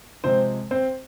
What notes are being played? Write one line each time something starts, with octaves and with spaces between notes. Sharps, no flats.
C3 F3 G#3 C4 C5
C4 C5